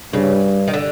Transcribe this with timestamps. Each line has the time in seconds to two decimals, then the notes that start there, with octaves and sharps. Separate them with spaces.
0.13 G2 C#3
0.68 D#3
0.74 D3